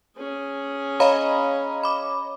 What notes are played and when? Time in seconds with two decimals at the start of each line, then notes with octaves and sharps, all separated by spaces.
0.17 C#4 G#4
1.00 C#5 D#5 F5 A#5 B5
1.83 B5 D6